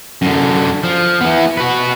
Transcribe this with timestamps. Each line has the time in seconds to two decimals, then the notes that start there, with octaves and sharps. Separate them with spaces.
0.22 F#2 D3
0.84 F3
1.21 E3 B3
1.57 F#4 B4